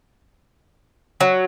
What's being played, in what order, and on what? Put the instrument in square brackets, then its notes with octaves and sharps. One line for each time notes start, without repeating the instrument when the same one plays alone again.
[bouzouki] F#3